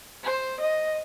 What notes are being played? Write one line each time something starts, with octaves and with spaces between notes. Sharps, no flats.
C5
D#5